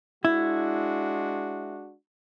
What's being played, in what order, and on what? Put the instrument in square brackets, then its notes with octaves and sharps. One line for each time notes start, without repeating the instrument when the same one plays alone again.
[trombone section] G#3 D4 F#4 [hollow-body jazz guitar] E4